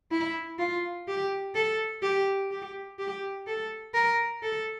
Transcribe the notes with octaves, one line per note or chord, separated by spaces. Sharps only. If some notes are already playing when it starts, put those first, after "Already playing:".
E4
F4
G4
A4
G4
G4
G4
A4
A#4
A4